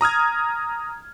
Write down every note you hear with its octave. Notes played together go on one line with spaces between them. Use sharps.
A#5 D#6 F6 G#6